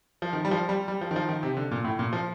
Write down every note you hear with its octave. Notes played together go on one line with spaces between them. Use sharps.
F3
D#3
G3
F3
G3
G3
F3
D#3
F3
D#3
C3
D3
A#2
A2
A#2
F3